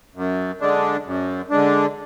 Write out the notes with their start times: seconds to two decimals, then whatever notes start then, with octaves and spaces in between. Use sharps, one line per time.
0.16 F#2
0.61 D3 G#3 D4
1.06 F#2
1.50 D3 G#3 D4